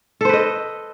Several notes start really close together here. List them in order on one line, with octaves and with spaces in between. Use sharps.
A4 C5 B4 D#5